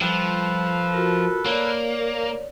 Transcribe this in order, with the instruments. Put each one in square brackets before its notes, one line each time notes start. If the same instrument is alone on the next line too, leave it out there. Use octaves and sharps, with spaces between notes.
[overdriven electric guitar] F3 [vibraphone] G3 [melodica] A4 B4
[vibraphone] F4 F#4 A#4
[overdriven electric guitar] A#3 [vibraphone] C#5 D5